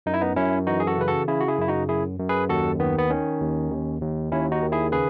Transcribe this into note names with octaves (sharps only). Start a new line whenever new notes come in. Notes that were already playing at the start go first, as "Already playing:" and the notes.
F#2 D#4
E4
B3 D#4
F#2 C#4 E4
E3 D#4 F#4
G#4
F#4 A4
C#3 B4
F#4 A4
C#3 E4 G#4
F#4
E4 G#4
F#2 E4
D#4 F#4
F#2 E4 G#4
F#2
G#4 B4
D#2 F#4 A4
D#3 B3
B3
D#3 C#4
D#2
D#2
D#2
D#2 C#4 E4
D#4 F#4
D#3
E4 G#4
C#3 G#4 B4